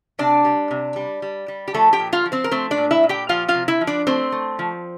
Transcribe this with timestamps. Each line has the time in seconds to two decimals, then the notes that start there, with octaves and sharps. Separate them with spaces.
0.19 C3 D4 D5
0.45 G3
0.71 C3
0.96 G3
1.22 G3
1.48 G3
1.68 G4
1.74 F3 A3 A4
1.93 G4 G5
2.00 A#2
2.13 F4 F5
2.26 F3
2.32 C4 C5
2.44 A#4
2.51 A3 C4 C5
2.71 D4 D5
2.77 A#2
2.91 E4 E5
3.03 A#2
3.09 G4 G5
3.29 F3 F4 F5
3.48 F4 F5
3.55 C3
3.68 E4 E5
3.81 F3
3.87 D4 D5
4.07 A3 C4 C5
4.32 A3
4.59 F3